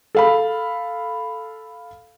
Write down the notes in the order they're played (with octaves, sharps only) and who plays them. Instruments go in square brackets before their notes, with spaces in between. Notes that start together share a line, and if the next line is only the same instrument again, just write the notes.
[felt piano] A4 F5 B5